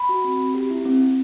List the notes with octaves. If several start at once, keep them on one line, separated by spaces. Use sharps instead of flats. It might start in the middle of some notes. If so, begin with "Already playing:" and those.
Already playing: B5
F#4
C4
C4
G4
E4
C4
C4